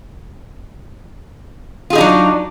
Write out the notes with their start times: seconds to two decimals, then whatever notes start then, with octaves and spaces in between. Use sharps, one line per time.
1.90 F4
1.93 G#4
1.95 D#4
1.98 D4
2.01 F#3